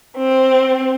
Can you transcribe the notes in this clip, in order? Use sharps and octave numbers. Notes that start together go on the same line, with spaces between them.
C4